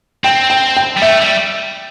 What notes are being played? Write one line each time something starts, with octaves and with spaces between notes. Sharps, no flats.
C4 G5
G5
G5
G3
A3 E5
G3